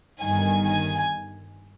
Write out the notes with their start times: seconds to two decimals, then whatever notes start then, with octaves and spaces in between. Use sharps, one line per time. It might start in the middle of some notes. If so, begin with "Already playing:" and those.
0.20 G1 G2 D#3 G#5
0.68 G#5